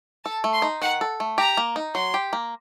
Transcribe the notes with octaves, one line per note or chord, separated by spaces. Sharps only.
A4 A5
A3
C6
D#4
D#3 F#5
A4
A3
G4 A#5
A#3
D#4
F#3 C6
G4
A#3